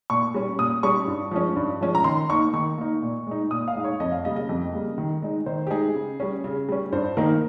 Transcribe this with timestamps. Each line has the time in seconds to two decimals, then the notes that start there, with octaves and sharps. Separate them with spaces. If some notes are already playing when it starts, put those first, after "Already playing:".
0.10 A#2 C#6
0.34 G3 C#4
0.58 A#2 D#6
0.83 G3 C#4 C#6
1.08 G2
1.31 F3 G#3 C#4
1.56 G2
1.81 F3 G#3 C#4
1.95 A#5
2.04 D#3 C6
2.29 A#3 D#4 C#6
2.53 D#3 C#6
2.78 A#3 D#4
3.02 A#2
3.27 G#3 D#4
3.51 A#2 D#6
3.68 F5
3.75 G#3 D#4
3.84 C#5
4.00 F2 D#5
4.12 F5
4.24 C#3 G3 A#3 D#5
4.36 D#5
4.49 F2
4.73 C#3 G3 A#3
4.98 D#3
5.22 G#3 D#4
5.46 D#3 C5
5.67 G4
5.70 G#3 D#4 G#4
5.95 C#3
6.20 G3 C#4
6.44 C#3
6.69 G3 C#4
6.93 G2 C5
7.17 D#3 A#3 D#4 A#4